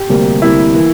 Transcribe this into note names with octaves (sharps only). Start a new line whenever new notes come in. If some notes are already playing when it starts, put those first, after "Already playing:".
Already playing: G4
D2 C3 G3 A#3
D2 C3 G3 A#3 E4
E3 A#3